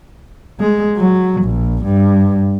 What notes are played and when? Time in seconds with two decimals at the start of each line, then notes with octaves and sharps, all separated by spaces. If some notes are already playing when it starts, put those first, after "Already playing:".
0.60 G#3
0.97 F#3
1.42 A#1
1.84 G2